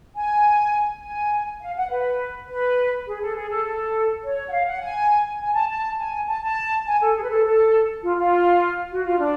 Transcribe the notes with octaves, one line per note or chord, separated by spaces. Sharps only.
G#5
G#5
F5
F#5
B4
B4
G#4
A4
G#4
A4
A4
C#5
F#5
F5
F#5
G#5
G#5
A5
A5
G#5
A5
A5
G#5
A4
G#4
B4
A4
A4
F4
F4
F#4
F4
D4